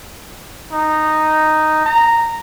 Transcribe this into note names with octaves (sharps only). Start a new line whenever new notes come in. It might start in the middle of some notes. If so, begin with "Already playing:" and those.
D#4
A#5